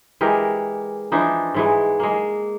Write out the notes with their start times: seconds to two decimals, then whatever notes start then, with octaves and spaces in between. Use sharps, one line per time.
0.21 E3 G#3 G4 A#4
1.12 E3 F3 D4 D#4
1.54 G#2 E3 G#3
2.00 G#3 A#3